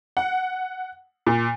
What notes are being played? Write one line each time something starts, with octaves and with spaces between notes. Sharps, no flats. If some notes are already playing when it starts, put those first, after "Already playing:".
F#5
A#2